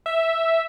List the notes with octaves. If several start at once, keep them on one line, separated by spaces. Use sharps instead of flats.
E5